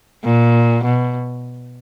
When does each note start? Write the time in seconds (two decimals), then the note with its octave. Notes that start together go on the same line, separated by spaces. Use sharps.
0.24 A#2
0.84 B2